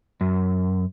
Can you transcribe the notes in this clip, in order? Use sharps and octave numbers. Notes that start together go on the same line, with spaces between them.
F#2